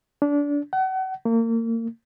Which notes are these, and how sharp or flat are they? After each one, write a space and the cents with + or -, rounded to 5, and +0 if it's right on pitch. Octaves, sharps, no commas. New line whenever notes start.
D4 -25
F#5 +35
A#3 -30